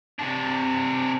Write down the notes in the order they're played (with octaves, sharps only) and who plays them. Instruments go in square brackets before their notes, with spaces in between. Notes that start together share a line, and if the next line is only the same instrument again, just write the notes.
[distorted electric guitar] C3 D4